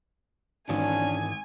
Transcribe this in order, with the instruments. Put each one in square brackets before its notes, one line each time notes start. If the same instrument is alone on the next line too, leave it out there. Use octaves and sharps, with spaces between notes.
[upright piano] G#1 [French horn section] F2 C#4 D4 [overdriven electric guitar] G#2 E3 [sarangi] G#5